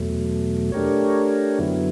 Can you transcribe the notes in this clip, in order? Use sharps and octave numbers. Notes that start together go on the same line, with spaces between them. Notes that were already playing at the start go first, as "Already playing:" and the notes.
Already playing: E2 B2 F#3 A3
A3 D4 G4 A#4 C#5
F#2 D3 F#3 B3 E4